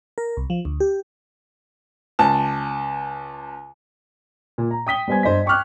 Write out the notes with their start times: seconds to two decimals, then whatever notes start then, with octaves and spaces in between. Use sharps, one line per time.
0.18 A#4
0.37 C2
0.50 F3
0.65 D2
0.80 G4
2.19 C#2 A5
4.58 A#2
4.71 A#5
4.87 G5 D#6 B6 G7
5.08 G3 B3 C5 G#5 G#6
5.23 G2 C5 D#5 B6
5.46 G5 C#6 D6 F6 F#6